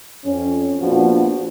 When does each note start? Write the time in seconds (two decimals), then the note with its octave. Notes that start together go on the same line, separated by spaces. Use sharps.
0.24 F2 C#4
0.80 A#1 A#2 F3 B3 D4 F#4